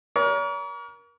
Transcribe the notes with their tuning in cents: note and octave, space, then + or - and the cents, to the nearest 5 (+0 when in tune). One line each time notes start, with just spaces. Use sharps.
A#4 +30 C#5 +45